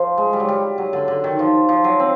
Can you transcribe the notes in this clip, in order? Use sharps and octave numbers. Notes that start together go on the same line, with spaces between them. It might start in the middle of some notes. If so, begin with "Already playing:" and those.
Already playing: F3
G#3
G3
F#3
G3
F#3
D3
D3
D#3
F3
F3
F#3
C4